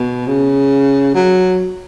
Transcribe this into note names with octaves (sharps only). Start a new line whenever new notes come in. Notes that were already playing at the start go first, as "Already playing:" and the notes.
Already playing: B2
C#3
F#3